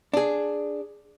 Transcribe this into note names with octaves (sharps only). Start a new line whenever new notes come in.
D4 G#4